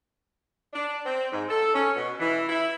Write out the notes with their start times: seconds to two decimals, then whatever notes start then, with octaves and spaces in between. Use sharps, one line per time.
0.73 D4
1.06 C4
1.32 G#2
1.49 A4
1.75 C#4
1.96 B2
2.20 E3
2.49 E4